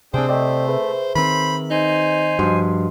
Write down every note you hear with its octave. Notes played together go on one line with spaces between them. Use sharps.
C3 C4 D4 G#4 C5 G5
A3 D5 D#5 G5
G#4 B4 E5
D#3 C4 C5 B5
D#4 C5 G#5
G2 F3 F#4 D#5 C6